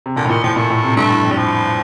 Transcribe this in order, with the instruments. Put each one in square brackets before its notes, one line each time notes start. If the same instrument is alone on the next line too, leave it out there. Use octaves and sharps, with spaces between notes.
[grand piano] C3
[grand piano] A#2 [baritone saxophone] D3
[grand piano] A2
[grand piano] A#2 [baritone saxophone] D#3
[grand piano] A2 [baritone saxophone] F3
[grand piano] A#2 [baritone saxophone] A3
[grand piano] A2
C3
[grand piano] G2 [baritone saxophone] A3
[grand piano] A2
F2
[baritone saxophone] G3
F3